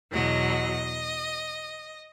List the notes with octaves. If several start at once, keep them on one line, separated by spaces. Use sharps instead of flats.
E2 B2 F#3 D#5